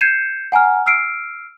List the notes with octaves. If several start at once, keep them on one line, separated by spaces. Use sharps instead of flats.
G6 G#6 C7 C#7 D#7 E7
F#5 G#5 A#5 F6
E6 F6 C7 D7